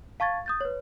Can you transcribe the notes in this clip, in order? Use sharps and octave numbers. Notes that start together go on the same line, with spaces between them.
F5 A5 C#6 G#6 A6
D#6 G6 A6
B4 C#5